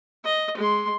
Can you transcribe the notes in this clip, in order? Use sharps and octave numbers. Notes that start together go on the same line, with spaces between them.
D#5
G#3 C6